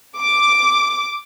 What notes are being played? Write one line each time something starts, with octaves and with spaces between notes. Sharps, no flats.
D6